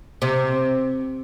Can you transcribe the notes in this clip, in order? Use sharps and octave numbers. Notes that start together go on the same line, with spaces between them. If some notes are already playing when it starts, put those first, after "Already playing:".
C3